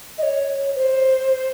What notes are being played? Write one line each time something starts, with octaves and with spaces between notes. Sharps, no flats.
D#5
C#5
C5